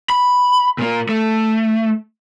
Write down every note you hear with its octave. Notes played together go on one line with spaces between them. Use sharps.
B5
A#2 A#3
A3